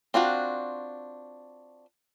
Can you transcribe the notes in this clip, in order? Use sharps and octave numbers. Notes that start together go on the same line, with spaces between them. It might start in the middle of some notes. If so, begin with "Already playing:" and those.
C4 D4 F4 F#4